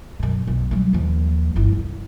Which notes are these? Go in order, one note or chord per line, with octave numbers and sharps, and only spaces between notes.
F#2 B2
B1
F#3 G3
D#2 F3
G1 E4
C2